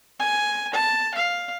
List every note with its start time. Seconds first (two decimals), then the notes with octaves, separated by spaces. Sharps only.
0.19 G#5
0.74 A5
1.15 F5